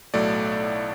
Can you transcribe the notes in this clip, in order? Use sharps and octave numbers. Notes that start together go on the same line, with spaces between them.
B1 A2 F#3 A3 D5